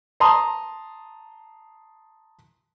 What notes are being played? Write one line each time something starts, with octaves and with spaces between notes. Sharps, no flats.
A5 A#5 C6 D#6